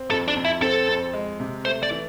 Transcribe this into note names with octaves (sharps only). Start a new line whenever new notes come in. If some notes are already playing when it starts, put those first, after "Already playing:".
Already playing: C4
F2 A4
D4
F2
E4
C4 A4
F2
G#3
C3
A3 C5
D5
E3